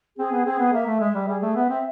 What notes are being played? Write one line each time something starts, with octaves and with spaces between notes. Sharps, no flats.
C4 G#4
B3
C4 G#4
B3
A#3 E5
A3
G#3 E5
G3
G3 G#4
A3
B3 E5
C4